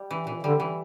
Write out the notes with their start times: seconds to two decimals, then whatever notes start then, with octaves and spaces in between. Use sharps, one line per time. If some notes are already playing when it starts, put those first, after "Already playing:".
Already playing: G3
0.11 E3
0.27 A#2 E3
0.43 D3 G3
0.60 E3